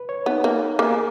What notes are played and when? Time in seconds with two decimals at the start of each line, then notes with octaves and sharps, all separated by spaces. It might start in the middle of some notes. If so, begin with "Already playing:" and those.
Already playing: B4
0.09 C#5
0.26 B3 D#4
0.44 A#3
0.79 A#3 G#4
0.91 A#4